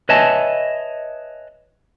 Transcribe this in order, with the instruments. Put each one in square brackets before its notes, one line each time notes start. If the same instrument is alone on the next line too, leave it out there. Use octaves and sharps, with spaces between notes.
[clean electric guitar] B4 C#5 D#5 E5 G#5 A5